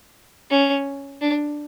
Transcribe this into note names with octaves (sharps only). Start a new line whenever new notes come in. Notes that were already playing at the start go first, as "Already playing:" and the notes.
C#4
D4